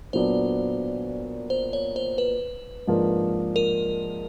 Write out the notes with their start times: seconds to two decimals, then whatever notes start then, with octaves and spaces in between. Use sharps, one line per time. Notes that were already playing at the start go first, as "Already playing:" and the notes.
0.13 A#2 F#3 B3 D4 C5
1.50 C5
1.73 C#5
1.96 C5
2.18 B4
2.87 G#2 F3 A#3 D4
3.56 A#4